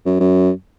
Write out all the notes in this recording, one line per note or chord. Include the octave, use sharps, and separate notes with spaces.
F#2
F#2